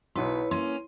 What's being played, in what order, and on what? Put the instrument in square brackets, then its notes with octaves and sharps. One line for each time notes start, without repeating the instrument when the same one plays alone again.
[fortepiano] B1 F#3 C6 [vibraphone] E4 C#5 [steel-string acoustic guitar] B4
[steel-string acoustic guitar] A#3 C#4 [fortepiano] C6